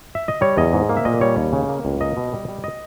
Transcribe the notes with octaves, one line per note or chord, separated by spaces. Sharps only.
E5
D#5
G3 C#5
E2 D#5
G#2
A#3
E5
A#2 D#5
G3 C#5
D#2
C#3
A#3
C#2
A#3 D#5
B2
G3
G3
D#5